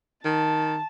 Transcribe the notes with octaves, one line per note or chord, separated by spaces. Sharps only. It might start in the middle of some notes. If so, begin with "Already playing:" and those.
D#3 A5